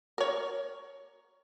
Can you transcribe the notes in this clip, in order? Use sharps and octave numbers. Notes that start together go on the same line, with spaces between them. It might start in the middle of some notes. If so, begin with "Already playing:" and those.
A#4 C#5